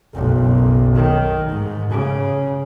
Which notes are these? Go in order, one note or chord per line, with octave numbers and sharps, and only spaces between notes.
F#1 B1
D#3
G#2
C#3